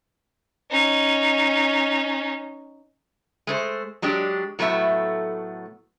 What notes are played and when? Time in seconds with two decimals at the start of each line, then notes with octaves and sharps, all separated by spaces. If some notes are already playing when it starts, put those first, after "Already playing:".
0.71 C#4 D#4
3.47 G#3 A3 C5
4.02 F#3 G#3 D4 G4
4.59 A2 F#3 A3 B3 E5